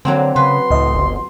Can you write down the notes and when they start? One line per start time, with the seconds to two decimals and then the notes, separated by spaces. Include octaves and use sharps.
0.05 D3 F#3 A#3 C4
0.36 C#3 B4 C6
0.71 C#2 A2 D#5
0.95 G1